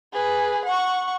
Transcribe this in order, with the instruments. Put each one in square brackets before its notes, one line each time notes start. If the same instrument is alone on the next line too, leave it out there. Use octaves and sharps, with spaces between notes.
[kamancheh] G#4 B4
F#5 C#6